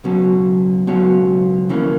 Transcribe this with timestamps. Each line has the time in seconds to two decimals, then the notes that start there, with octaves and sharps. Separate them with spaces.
0.04 C#2 B2 F#3 C#4
0.87 C#2 B2 F#3 C#4
1.69 D#2 C#3 E3 A#3 C#4